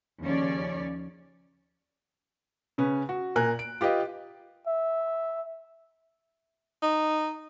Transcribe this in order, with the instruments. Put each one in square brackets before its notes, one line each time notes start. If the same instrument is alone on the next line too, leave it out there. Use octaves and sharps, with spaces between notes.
[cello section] D#2 C#3 F3 C#4 C#5 D5
[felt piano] C#3 C#4 B4
F#4
A#2 A#4 G#5 F#6
D7
F4 G4 B4 D#5 F5
[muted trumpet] E5
[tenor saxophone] D#4